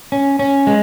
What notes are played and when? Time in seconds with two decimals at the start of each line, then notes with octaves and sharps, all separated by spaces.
0.12 C#4
0.39 C#4
0.67 G#3